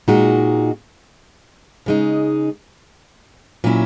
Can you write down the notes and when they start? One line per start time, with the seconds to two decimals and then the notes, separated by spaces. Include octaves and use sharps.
0.08 A#2 G#3 D#4 F#4
1.86 C#3 G#3 D#4
3.64 A#2 F#3 C#4 E4